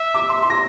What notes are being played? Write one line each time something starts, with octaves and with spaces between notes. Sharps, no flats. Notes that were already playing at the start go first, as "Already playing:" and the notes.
Already playing: E5
D6
C6
C6
A#6